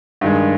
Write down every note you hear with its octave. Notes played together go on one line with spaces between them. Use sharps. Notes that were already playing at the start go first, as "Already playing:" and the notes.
G2 D#3 G#3